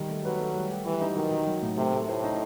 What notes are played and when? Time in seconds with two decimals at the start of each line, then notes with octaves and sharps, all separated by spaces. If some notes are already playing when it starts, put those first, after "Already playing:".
Already playing: D#3 G3
0.09 A3
0.24 F#3 B4
0.39 A3
0.55 G3
0.70 G4
0.85 E3 G3
1.01 D#4
1.16 D#3 F#3
1.31 F#3
1.47 F#3
1.62 A2
1.77 C3 A3
1.93 A3
2.08 A2 C5
2.24 D#4